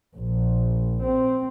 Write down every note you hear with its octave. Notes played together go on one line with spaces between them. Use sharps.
A#1
C4